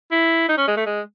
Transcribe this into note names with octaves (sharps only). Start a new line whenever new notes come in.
E4
D#4
C#4
G#3
A3
G#3